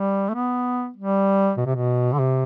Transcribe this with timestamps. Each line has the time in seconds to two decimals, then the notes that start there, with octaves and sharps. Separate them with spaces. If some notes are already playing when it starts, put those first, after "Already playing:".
Already playing: G3
0.29 A3
0.34 B3
0.96 G3
1.57 B2
1.66 C3
1.75 B2
2.13 D3
2.18 C3